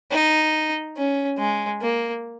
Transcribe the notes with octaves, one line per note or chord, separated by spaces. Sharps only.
D#4
C#4
G#3
A#3